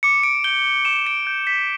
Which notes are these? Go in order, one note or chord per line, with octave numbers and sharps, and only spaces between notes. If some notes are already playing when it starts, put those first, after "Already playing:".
D6 C#7
D7
G6 G7
D6 E7
D7
G6
B6